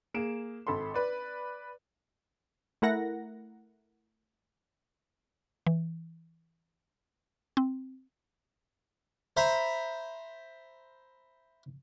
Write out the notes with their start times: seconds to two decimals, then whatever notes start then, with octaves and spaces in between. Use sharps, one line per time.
0.14 A#3 G#4 D7 E7
0.67 G#1 A4 B5 C6
0.94 B4 D5
2.82 A3 E4 A#4 F#5 A#6
5.67 E3
7.57 C4
9.37 C5 E5 A#5 B5